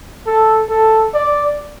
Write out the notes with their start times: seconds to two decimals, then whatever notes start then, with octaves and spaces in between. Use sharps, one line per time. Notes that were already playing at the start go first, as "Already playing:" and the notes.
0.26 A4
0.69 A4
1.14 D5